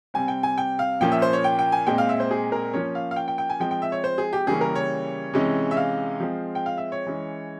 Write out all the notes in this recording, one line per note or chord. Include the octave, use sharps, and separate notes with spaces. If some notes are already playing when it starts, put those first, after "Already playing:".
C3 G3 C4 G#5
G5
G#5
G5
F5
A#2 F3 A#3 C#4 G5
E5
C5
C#5
G5
G5
G#5
A#2 G#3 C4 G5
F5
E5
C5
G#4
A#4
F3 A#3 C#4 C#5
F5
F5
G5
G5
G5
G#5
F3 G#3 C4 G5
G5
E5
C#5
C5
G#4
G4
C#3 E3 G3 A#3 C#4 G#4
A#4
C#5
C3 E3 G#3 C#4
E5
F5
F3 G#3 C4
G5
F5
E5
C#5
E3 G#3 C#4